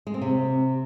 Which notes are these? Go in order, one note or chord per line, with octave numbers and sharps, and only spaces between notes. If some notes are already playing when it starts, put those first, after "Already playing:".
G#3
C4
C3